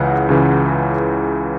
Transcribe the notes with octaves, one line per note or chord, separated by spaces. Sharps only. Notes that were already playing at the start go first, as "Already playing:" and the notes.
Already playing: C#2 C#3 E3 F#5
C#2 C#3 E3